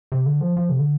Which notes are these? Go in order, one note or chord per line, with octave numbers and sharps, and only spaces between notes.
C3
D3
F3
F3
C3
D3